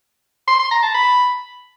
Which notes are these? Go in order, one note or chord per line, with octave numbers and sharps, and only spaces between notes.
C6
C6
A#5
A5
B5